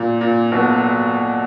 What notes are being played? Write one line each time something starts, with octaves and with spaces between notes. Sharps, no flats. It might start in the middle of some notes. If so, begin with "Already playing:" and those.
Already playing: A#2
A#2
B1 B2